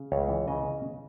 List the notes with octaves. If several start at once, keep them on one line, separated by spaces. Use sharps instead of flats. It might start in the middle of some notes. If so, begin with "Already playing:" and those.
Already playing: C#3
C#2 C#5
E3
C#3 D#5